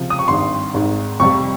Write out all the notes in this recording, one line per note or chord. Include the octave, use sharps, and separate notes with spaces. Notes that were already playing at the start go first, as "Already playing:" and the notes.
Already playing: C#2 C3 F3
D#6
C#6
G#1 G2 D#3 C6
G#1 G#2 D#3
F2 C3 G3 C#6